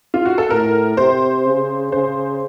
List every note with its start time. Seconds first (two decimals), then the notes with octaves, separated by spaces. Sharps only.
0.14 F4
0.25 F#4
0.38 A4
0.50 A2 A#4
0.97 C3 C5
1.46 C#3
1.92 C#3 C5